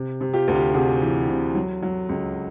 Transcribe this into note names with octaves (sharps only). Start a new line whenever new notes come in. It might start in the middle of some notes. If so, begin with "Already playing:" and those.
Already playing: C3
C3
F4 G4
D2
F4 G4
C3 F#4 G#4
E3
C3
F#3
F#3
C#2